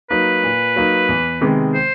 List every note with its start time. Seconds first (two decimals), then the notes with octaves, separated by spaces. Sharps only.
0.11 F#3 A#3 D#4 B4
0.43 A#2
0.76 F#3 A#3 D#4
1.09 E2
1.41 C3 D#3 G#3 B3
1.74 C5